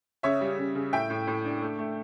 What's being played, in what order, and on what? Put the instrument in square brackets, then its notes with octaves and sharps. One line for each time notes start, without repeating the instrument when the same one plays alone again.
[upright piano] C#3 C#5 E5
G3
C#3
C#3
A2 E5 G5
A2
A2
D4
A3
A3